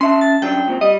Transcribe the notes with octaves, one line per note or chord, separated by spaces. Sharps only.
C#4 E5 A5 C6
A6
F#2 F#3 D4 G5
A#2 C4
G3 D#5